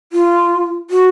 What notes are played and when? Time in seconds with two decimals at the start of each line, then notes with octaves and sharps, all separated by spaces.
0.13 F4
0.90 F#4